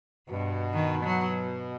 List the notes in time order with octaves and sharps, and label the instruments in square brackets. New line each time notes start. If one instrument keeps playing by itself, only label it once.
[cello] G2 [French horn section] B2
[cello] D#3
F#3